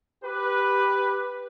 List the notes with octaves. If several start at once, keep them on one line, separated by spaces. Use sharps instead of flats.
G4 B4